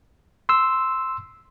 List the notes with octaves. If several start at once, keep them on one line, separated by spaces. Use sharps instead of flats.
C6 E6